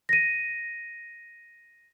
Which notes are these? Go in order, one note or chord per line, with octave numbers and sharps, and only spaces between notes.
A#6 D#7